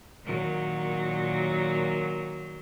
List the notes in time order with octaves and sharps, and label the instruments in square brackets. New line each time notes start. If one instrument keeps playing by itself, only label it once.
[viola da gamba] A#2 D#3 F#3